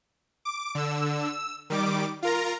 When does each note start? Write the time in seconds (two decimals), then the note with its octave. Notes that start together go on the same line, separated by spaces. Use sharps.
0.45 D6
0.75 D3 E6
1.27 E6
1.70 D#3 G3 D6
2.22 F4 A#4 A#5